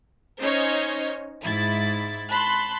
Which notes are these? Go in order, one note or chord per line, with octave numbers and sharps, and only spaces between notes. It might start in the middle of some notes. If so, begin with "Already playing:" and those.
C#4 D#4 C5 C#5 D#5
G#2 E4 A6
A5 B5 C6 F#6